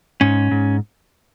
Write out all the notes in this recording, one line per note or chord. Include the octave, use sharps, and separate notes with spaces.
G#2 C#4
G#2